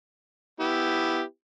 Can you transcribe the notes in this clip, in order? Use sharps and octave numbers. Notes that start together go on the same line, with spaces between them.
B3 E4 G4